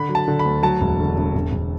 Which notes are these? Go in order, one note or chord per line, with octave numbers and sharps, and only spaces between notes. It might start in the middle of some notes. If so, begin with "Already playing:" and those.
Already playing: D3 B5
F#3
A5
D3
B5
D2
F#3 A5
E1
D3
E1
E1
E1